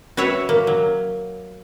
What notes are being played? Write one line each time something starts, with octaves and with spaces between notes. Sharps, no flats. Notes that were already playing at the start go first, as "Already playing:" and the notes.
F#4 B4 C#5 E5 F#5
A#3
F#3